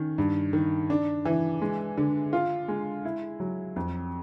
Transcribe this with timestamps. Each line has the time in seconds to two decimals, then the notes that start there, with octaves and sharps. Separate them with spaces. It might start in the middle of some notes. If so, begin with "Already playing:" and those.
Already playing: D#3 C#4
0.18 G2
0.53 D#3
0.90 D4
1.25 E3
1.62 G#3
1.98 D3
2.33 F4
2.68 G#3
3.05 E4
3.40 F#3
3.76 F2